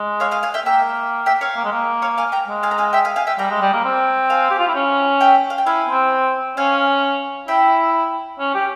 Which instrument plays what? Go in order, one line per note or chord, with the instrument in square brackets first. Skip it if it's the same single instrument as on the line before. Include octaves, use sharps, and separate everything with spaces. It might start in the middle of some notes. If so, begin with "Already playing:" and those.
Already playing: [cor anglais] G#3
[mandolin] C#5 F5
F5 G#5
F5 G#5
E5 G5
[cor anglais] A#3 [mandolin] E5 G5
[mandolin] E5 G5
C#5 F5
[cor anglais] A#3
G#3
A#3
[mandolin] C#5 F5
F5 G#5
G5 A#5
[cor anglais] G#3
[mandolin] F5 G#5
A#5
F5 G#5
E5 G5
F5 G#5
F5 G#5
E5 G5
[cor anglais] G3 [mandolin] G5 A#5
[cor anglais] G#3
G3
A#3
C4
[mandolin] F5 G#5
[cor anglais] G4
F4
E4
C#4
[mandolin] E5 G5
F5
G5
[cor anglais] E4 [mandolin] F5 G#5
[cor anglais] C4
[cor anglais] C#4 [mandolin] F5 G#5
[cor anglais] E4 [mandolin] E5 G5
[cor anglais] C#4
G4